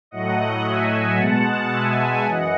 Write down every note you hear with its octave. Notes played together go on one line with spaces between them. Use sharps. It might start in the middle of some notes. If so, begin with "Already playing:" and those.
A2 F#3 A3 D#5 F#5
E5 G#5
B2 G#3 F#5 A5
E5 G#5
F#2 E3 D#5 F#5